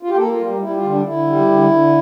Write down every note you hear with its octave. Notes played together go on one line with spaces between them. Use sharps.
F4
G4
A#3 A4
F4
G3
G3 E4
F4
D3
D4
D3 E4
G3
D3
D3